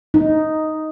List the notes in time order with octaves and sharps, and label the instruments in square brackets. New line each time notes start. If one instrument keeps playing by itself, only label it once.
[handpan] D#4